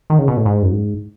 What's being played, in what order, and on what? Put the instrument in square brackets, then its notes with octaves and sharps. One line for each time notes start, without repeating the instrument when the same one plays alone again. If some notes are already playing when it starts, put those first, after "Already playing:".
[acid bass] D#3
C#3
B2
A2
G#2
F#2
G#2